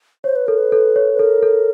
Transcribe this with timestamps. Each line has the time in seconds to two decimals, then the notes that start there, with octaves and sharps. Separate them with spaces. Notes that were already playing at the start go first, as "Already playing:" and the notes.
0.24 C5 C#5
0.36 B4
0.47 A4 A#4
0.58 B4
0.72 A4
0.96 C#5
1.14 B4
1.19 A4 A#4
1.43 A4